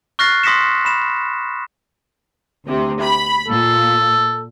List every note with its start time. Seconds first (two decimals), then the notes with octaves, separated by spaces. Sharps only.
0.19 C#6 F6 F#6 A6 A#6 C7
0.44 C6 D#6 A#6 B6 C#7 E7
0.85 B5 E7
2.65 D2 C3
3.01 B5
3.49 A#2 A4